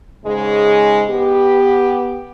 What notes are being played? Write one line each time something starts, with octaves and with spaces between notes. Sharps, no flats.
G#2 C#3 G#3
B3 G4